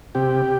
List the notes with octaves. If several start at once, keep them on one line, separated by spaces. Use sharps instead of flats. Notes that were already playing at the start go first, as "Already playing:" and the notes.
C3 G4